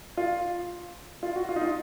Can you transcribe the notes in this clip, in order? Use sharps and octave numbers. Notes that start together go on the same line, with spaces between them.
F4
F4
F#4
F4
D#4
F4